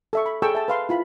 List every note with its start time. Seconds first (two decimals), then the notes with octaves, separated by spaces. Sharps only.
0.13 A4 E5 C#6
0.26 B5
0.42 G#4 A4 G5 A5 C#6 E6
0.55 E5 A5
0.68 B4 F5 C6
0.89 E4 F4 B5